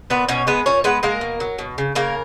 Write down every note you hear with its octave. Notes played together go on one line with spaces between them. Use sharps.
A#2 B3 B4
B2 C#4 C#5
G#3 B3 B4
A#2 C#4 C#5
G#3 B3 B4
G#3 A#3 A#4
B2
F#3
B2
C#3
C#3 A#3 A#4